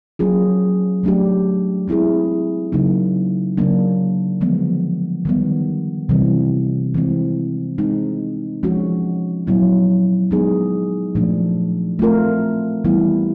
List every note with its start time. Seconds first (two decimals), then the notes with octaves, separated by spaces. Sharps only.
0.19 F#3 A#3 C#4 F4 G#4
1.03 F#3 A3 D4 G4
1.88 G#3 C4 E4 G#4
2.72 C#3 F#3 A#3 D#4
3.57 C#3 F#3 A#3 D4
4.41 D3 F3 G#3 B3
5.25 D#3 G3 B3
6.09 C3 E3 G3 C4
6.94 E3 G#3 C4
7.78 G#3 C4 D#4
8.63 F3 G#3 C#4 F#4
9.47 A#2 F#3 B3 E4
10.31 G#3 B3 D#4 G#4
11.15 A#2 F3 A3 D4
11.99 A3 C4 F4 A#4
12.85 E3 G3 B3 E4